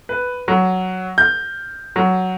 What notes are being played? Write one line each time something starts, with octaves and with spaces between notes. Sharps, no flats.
B4
F#3
G6
F#3